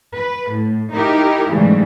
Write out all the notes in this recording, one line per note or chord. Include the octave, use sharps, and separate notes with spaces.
B4
A2
D#4 E4 G4 A#4
G#2 C#3 E3 F#3 G3 A3